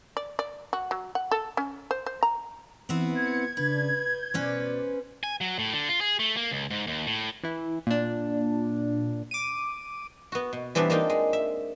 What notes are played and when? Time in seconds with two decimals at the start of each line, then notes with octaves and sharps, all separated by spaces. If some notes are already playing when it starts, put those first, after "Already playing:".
0.17 D5
0.39 D5
0.73 F#4
0.91 F#3
1.15 F#5
1.31 A4
1.57 C#4
1.91 C5
2.06 C5
2.23 A#5
2.89 E3 B3 C4 E4
3.15 G#6 C#7
3.57 C#3 D4 B4
4.06 G6
4.34 B2 C#4 B4 C5 D5
5.23 G#5
5.41 F#3
5.59 A2
5.73 D3
5.89 F4
6.01 G#4
6.19 A3
6.37 A#3
6.51 C#2
6.70 G#2
6.87 D#2
7.07 A2
7.44 E3 E4
7.87 A#2 D4
9.31 D6 D#7
10.32 B3 F#4
10.53 B2
10.75 E3 G3 B3 C4 D4
10.90 A#3 D4 D#4 F4 G5
11.10 G#3
11.33 E5